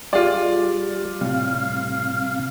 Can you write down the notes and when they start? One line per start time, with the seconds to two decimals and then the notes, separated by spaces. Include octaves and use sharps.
0.13 G3 F4 G4 G#4 D5 G5
1.21 A2 C3 G3 F5